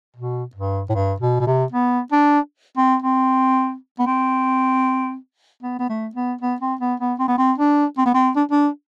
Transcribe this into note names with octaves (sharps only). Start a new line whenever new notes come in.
B2
G2
A2
G2
B2
B2
C3
B3
D4
C4
C4
B3
C4
B3
B3
A3
B3
B3
C4
B3
B3
C4
B3
C4
D4
C4
B3
C4
D4
D4